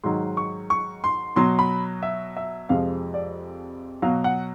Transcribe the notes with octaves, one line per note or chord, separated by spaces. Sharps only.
G#2 D#3 F#3 C6
C#6
C#6
C6
B2 F#3 C6
B5
E5
E5
F2 C3 F3 G#3 F5
D5
B2 F#3 F5
F#5